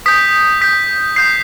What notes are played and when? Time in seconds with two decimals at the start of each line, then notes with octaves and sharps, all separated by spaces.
0.06 D#6 G6 B6
0.61 D#6 G6 B6
1.16 D#6 G6 C7